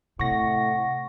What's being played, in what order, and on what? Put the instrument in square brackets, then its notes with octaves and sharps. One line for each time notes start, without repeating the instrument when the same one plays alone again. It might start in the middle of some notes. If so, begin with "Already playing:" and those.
[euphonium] A2 [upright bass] C3 [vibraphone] F#5 [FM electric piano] C#6 A#6